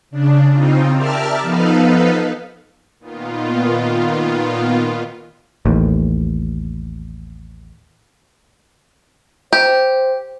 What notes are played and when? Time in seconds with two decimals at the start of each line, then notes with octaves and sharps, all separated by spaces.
0.11 C#3 D4
0.51 C#3 C4 D#4 F4
0.93 G4 A#4 D5 E5 A5 F6
1.42 F3 B3 D#4 A4 B4 F5
2.99 A#2 D#3 B3 F4
5.65 A1 D#2
9.53 G4 C5